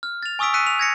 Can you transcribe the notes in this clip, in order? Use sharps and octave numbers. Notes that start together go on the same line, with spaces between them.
F6
A6 F7
G#5 C#6 D#6 E6 B6 D7
E6 F#6 B6 C#7 D#7
F7
G#6 A#6 C#7